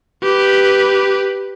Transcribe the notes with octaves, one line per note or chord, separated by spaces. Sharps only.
G4 B4